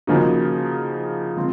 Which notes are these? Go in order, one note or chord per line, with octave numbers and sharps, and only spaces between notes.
C#3 F3 A#3 D#4 F#4
F3 G#3 C4 F4